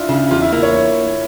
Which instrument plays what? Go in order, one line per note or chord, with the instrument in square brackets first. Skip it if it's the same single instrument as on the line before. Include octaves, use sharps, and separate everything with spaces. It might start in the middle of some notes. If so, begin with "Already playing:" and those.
Already playing: [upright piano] D4 E4 F4
[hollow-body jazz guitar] C#3
[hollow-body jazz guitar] E2 [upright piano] F4
[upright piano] E4
[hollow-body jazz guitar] A#3 [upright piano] E4
[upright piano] C#5